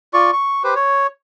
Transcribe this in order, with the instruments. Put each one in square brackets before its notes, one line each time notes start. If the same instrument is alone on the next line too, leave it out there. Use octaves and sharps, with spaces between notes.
[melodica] F4 D5 C#6
C#6
G4 B4 C5
C#5